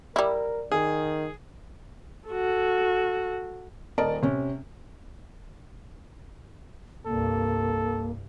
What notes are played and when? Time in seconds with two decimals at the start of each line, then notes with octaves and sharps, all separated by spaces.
0.16 G3 E4 A#4
0.72 D#3 G#4
2.28 F#4 A4
3.98 D#1 A#4 D5 D#5 A5 D7
4.22 C3 C#4
7.06 C2 G2 A#3 A4